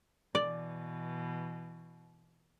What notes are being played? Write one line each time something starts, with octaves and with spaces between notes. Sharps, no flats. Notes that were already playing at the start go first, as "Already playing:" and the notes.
B2 E3 D5